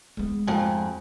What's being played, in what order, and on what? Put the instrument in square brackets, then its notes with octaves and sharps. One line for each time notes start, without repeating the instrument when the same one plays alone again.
[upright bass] G#3 B3
[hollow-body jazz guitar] F2 G#2